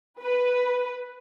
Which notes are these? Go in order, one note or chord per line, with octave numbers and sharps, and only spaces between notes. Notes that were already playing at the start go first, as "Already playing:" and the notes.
B4